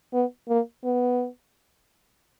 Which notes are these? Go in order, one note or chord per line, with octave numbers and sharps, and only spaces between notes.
B3
A#3
B3